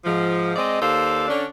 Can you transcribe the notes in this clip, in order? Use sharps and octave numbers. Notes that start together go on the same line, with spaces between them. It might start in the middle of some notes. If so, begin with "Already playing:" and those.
G#2 F3
G#3 C4 D5 D#5
D#2 A4 C5 D5 F5
D3 C#4 D4